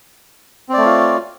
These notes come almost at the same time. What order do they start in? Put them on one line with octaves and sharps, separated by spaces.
C4 D5 A3 C#5 F4